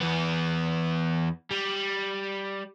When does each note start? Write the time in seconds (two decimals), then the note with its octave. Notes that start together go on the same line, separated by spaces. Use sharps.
0.01 E2 B3
1.51 G3